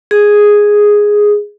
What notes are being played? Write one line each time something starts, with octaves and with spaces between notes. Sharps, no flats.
G#4